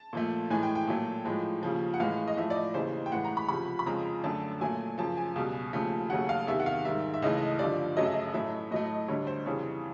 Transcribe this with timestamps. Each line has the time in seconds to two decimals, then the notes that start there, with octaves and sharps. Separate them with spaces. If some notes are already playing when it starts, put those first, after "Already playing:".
Already playing: A5
0.13 A#2 F3 A3
0.51 A2 E3 G#3 G#5
0.63 G5
0.75 G5
0.87 A#2 F#3 A3
1.25 A2 F3 G#3
1.63 D#2 C#3 F3
1.94 F#5
2.00 A2 E3 G#3 F5
2.28 D#5
2.37 A2 F3 A3 E5
2.50 D5
2.56 D#5
2.74 D#2 C#3 E3 C5
3.06 G5
3.12 A2 E3 G#3 F#5
3.25 A#5
3.37 B5
3.48 C#2 C3 F3 B5
3.79 B5
3.86 F2 C#3 F3 G#3 A#5
4.24 F#2 D3 F#3 A3 A5
4.61 A#2 F#3 A3 G#5
4.98 F#2 C#3 F3 A5
5.17 G#5
5.36 C#2 B2 G3
5.73 D#2 C#3 F3 A3
6.10 D#2 C#3 F#3 A3 F#5
6.29 F5
6.47 E2 C3 D#3 E5
6.60 F#5
6.66 F5
6.84 G#2 D#3 G3 E5
7.14 E5
7.22 C#2 C#3 E3 A3 D#5
7.59 G2 D3 F3 D5
7.97 F#2 C#3 F#3 A3 D#5
8.05 E5
8.14 D#5
8.34 A2 F#3 A3 E5
8.71 A2 F#3 A3 D#5
9.08 D2 D3 G3 C#5
9.27 C5
9.46 F2 C#3 E3 G3 C#5